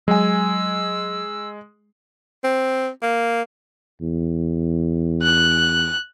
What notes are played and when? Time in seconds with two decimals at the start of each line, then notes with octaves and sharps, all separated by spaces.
0.08 F#3 G#3 G#5 E6
2.44 C4
3.02 A#3
4.01 E2
5.23 F#6